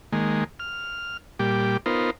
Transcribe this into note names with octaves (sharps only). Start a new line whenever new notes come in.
D#3 G#3 A#3
F6
A#2 G3 G4 D6
B3 D#4 F4 A#4 C5